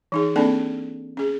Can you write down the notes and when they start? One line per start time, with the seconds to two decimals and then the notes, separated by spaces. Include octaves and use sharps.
0.12 E3 D#4 G#4
0.36 A#3 C4 D4 A4 D5 A5
1.17 C#4 G#4